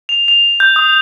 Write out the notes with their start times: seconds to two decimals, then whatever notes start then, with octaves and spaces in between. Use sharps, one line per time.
0.09 F7
0.28 F7
0.60 G6
0.76 D#6